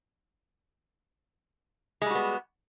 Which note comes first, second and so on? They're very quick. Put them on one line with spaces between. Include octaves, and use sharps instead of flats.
G#3 G3 F#4 B3